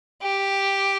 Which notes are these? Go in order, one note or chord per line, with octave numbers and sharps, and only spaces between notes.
G4